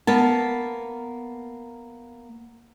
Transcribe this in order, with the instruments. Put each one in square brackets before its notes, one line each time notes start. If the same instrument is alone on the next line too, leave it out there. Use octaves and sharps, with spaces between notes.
[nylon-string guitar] A#3 B3 A5